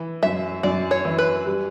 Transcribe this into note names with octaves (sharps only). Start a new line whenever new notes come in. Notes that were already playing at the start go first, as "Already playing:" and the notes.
Already playing: E3
F#2 E5
F#2 D5
C#5
E3
B4
G3